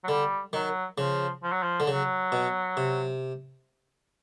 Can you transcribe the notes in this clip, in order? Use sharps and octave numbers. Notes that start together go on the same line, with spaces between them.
F#3
D3 G3
D#3 F#3
C#3 F3
F3
F#3
F3
D3
C#3 F#3
B2
C3